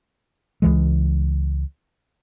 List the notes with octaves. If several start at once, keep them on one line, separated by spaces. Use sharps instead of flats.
C#2 E3 G#3